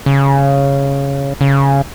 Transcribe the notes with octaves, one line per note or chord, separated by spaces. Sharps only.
C#3
C#3